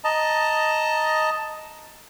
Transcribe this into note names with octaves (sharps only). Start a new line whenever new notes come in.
D#5 A5 A#5